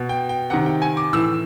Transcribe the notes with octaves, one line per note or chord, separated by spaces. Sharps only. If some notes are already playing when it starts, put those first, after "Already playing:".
Already playing: B2
G5
G5
C3 D#3 F#5
G5
G#5
D6
A2 E3 E6